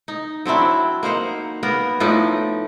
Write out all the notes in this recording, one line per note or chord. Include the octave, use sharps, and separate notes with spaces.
D#4
F#3 C4 D4 E4
A#3 D#4 C5 F#5
A#3 B3 A#4
A2 F3 D#4 D5